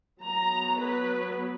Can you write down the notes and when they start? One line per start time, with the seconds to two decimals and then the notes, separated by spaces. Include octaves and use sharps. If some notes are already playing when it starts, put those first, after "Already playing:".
0.23 F#3 B3 A#5
0.79 B4